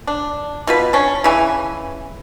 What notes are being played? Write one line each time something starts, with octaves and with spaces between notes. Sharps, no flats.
D4
B2 F4 B4
C#4 D4 A5
C#3 E3 G#5